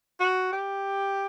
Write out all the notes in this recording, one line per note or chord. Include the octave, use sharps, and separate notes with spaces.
F#4
G4